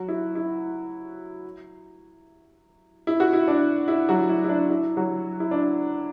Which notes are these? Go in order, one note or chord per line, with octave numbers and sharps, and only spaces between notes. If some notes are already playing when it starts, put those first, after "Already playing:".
Already playing: F#3 F#4
E4
E4
E4
F#4
E4
D4
E4
F#3 F#4
E4
E4
D4
E4
F#3 F#4
E4
D4